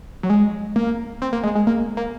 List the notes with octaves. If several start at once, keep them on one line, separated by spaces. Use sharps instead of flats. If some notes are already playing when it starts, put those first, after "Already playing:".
F#3
G#3
A#3
C4
A#3
G#3
G#3
A#3
A#3